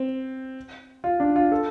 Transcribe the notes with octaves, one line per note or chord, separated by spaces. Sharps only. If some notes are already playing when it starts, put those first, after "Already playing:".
Already playing: C4
F4
D4
F4
A4